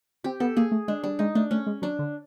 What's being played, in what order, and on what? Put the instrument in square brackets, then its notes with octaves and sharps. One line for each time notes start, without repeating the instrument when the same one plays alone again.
[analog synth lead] C4 [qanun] G4
[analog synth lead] B3 [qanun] A4
[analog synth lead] A#3 [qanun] G#4
[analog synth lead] A3
[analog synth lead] G#3 [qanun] D4
[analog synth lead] G3 [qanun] D4
[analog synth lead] G#3 [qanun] D#4
[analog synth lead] A3 [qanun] D4
[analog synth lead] A3 [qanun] C#4
[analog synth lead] G#3
[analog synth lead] F#3 [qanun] D4
[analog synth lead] D3